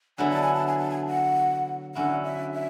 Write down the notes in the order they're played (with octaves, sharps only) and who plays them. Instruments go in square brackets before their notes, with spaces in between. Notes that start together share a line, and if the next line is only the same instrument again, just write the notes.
[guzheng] D3 F#3 B3 E4 [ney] G#5
[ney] A5
G#5
A5
G#5
A5
G#5
F#5
[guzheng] D3 F#3 C#4 E4 [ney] F#5
[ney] E5
E5